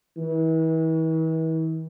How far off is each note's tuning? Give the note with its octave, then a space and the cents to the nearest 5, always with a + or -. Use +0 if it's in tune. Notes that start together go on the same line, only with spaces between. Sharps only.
E3 -40